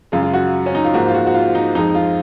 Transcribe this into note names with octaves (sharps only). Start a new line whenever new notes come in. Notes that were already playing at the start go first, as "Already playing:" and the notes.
F#2 C#3 G#3 F4
F4
F#4
C#4
D#4
F4
G#2 F3 A#3 F#4
F4
F#4
F#4
F4
D#4
F2 F3 G#3 D#4
F4